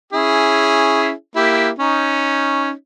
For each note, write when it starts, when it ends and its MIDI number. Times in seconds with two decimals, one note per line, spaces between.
0.13 1.11 61
0.13 1.11 64
0.13 1.11 68
1.36 1.70 58
1.36 1.70 64
1.36 1.70 67
1.79 2.71 61
1.79 2.71 63